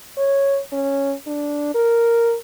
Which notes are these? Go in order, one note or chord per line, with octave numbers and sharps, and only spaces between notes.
C#5
C#4
D4
A#4